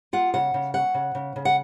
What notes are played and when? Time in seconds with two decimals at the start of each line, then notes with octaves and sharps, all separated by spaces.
0.13 F4 F#5
0.34 C#3 F#5
0.54 C#3
0.74 C#4 F#5
0.94 C#3
1.15 C#3
1.36 C#3
1.45 F#5